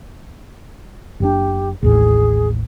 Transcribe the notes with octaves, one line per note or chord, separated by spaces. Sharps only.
F#1 A#2 D4 G4
A1 D#2 A2 G#4